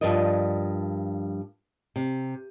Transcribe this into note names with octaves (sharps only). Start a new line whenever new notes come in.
G2 F3 A#4 D5 D#5
C3